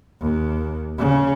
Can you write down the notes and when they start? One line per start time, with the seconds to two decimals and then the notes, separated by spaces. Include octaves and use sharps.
0.21 D#2
0.98 C#3